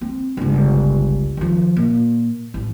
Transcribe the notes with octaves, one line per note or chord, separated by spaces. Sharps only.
C4
G1 C#2
D#3 F3
A#2
A1